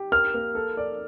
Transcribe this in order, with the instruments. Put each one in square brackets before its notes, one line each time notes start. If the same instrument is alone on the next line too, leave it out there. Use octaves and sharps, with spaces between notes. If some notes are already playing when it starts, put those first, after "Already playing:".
Already playing: [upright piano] G4
[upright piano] A#4 [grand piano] F6
[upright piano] A#3
A4
D5